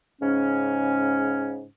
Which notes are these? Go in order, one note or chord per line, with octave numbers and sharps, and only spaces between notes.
G#2 C#3 C#4